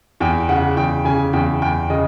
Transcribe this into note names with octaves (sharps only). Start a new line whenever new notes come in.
E2 G5
C#3 F#5
E2 G5
C#3 G#5
E2 G5
E2 G5
C#3 D#5